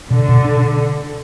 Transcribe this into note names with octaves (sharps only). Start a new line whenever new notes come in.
B2 D3
B2
D4